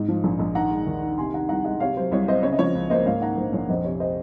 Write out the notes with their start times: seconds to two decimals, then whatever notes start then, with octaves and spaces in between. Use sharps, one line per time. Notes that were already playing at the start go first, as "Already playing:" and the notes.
Already playing: G#2 D#4
0.08 F3
0.24 A#1
0.39 A#1
0.55 D#3 F#5 A#5
0.71 G#3
0.87 D#2
1.03 D#4
1.18 C3 G#5 C6
1.33 D#3 F#5 A#5
1.49 C2 F#5 A#5
1.64 G#3 D#5 F#5
1.80 C3 C#5 F5
1.96 F#3 C5
2.11 C2 C#5
2.27 C4 C5 D#5
2.43 C#3 C#5
2.53 D#5
2.59 F3 C#5
2.75 C#2
2.90 A#3 C5 D#5
3.06 G#2 C#5 F5
3.22 D#3 F#5 A#5
3.37 A#1 C5
3.53 A#1 C#5
3.68 F2 C5 D#5
3.84 C3 C#5
4.00 C5 D#5